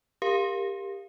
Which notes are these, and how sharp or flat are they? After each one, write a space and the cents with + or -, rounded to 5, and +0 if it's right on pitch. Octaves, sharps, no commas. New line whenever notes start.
G4 +20 A#4 +0 F5 +0